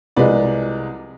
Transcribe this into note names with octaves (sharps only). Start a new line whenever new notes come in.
C2 C3 F3 G#3 B4 D5